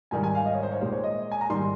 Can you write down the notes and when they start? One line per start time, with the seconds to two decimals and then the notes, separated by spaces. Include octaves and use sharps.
0.11 G#2 D#3 G3 G#5
0.23 G#5
0.35 F5
0.46 D#5
0.55 C#5
0.63 C5
0.72 C#5
0.81 A#2 G#3 C5
0.92 C#5
1.04 D#5
1.31 G#5
1.41 A#5
1.49 G#2 D#3 G3 C6